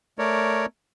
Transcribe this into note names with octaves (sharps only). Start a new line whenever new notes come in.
A3 A#4 C#5 D5